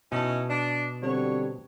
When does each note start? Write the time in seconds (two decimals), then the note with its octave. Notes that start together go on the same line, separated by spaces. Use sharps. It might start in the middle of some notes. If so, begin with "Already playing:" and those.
0.12 B2 C#4 D#4 E4 A5
0.50 D4
1.03 D3 F#3 G3 C4 C#5